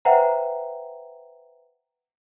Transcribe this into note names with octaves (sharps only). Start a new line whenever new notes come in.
B4 C5 E5 F#5 G5 A#5